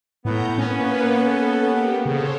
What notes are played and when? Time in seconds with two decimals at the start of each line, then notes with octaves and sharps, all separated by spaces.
0.25 A2 B3 A#5 G6
0.58 A#3 C#4 B4
1.17 A4
1.63 A#3 G4
2.06 C#3 A4 C5 C#5